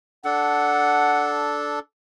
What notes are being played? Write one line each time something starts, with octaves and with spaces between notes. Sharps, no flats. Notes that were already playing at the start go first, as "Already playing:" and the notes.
D4 A4 F#5